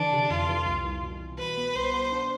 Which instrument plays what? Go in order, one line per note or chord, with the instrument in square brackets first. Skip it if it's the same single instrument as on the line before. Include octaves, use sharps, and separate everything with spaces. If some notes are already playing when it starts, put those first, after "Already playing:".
Already playing: [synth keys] D3 E3 [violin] D4
[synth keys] C3
[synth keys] F2 [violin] F4
[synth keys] E3
C2
C2
B2
C2
[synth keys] B2 [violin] B4
[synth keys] B3
[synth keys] C2 [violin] C5
[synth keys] B3
D4